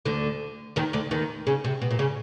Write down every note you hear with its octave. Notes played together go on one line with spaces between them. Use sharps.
D2 D3
D#2 D#3
D2 D3
D#2 D#3
C#3
C3
B2
A#2
C#3